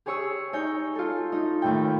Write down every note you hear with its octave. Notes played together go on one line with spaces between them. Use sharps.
G4 G#4 C#5 C#6 D#6 E6
D#4 C#5 G#5 G6
F4 A4
D#4
D#2 A2 G5